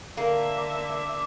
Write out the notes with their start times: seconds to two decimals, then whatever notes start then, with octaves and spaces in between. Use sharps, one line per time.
0.17 D3 A#3 A#4 E5
0.58 D6